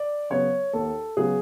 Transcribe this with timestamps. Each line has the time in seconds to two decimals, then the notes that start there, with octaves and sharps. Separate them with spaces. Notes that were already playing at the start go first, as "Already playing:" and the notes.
Already playing: D5
0.30 C#3 F#3 B3 C#5
0.73 D#2 A4
1.17 C#3 F#3 B3 G#4